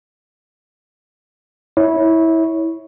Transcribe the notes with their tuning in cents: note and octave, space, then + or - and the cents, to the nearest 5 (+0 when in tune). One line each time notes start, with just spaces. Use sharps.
E4 -20 C#5 +0